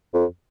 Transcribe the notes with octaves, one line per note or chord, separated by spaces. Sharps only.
F2